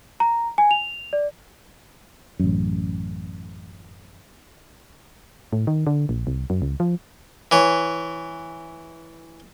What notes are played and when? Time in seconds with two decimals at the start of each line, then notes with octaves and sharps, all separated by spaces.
0.20 A#5
0.58 G#5
0.71 F7
1.13 D5
2.39 A1 F#2
5.53 A2
5.67 D#3
5.87 D3
6.09 A#1
6.27 C2
6.50 F#2
6.62 C#2
6.80 F3
7.51 E3 C#5